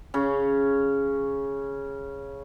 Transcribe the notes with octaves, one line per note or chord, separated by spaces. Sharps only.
C#3 C#4